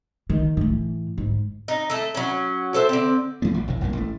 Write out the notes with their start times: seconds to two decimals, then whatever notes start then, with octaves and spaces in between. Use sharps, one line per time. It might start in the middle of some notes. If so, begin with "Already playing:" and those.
0.30 D#3
0.57 A2 E3
1.18 G#2
1.68 D#4
1.90 A3 A4
2.15 F#3 C#4
2.74 A4 C5 E5
2.89 D3 C4
3.42 A#2 E3 A3 B3
3.54 A1 A#2
3.68 F1 B1 A2 D#3
3.81 D#1 F#2 A#2 A#3
3.93 A1 A3